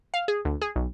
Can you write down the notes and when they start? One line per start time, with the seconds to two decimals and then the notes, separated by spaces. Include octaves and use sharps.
0.14 F5
0.28 G#4
0.45 D2
0.62 G#4
0.76 B1